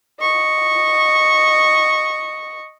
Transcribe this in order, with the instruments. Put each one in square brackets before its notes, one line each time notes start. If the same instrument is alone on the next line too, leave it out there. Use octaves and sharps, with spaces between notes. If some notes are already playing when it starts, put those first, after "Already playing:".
[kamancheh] D#5 C#6